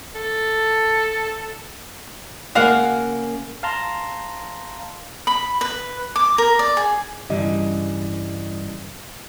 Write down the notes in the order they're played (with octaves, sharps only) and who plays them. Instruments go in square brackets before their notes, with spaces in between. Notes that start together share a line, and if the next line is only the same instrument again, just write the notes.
[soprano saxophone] A4
[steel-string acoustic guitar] C#3 A#3 [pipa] F#4 F5 F#5
[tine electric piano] F5 A5 A#5 C6
[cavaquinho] B5
B4
D6
A#4
D5
G#4
[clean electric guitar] G2 C#3 E3 [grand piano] G3 D#5